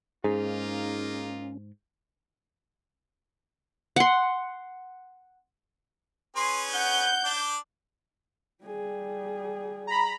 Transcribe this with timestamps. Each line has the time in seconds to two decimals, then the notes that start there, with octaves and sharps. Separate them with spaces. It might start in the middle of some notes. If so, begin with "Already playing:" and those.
0.24 G#2 A#3 C#4 D#4 F4 G#4
3.96 F#5 C6
6.36 C#4 G#4 B4 C6
6.74 F#5 G6
7.25 D4 D5
8.64 G3 G#4
9.87 A#5 B5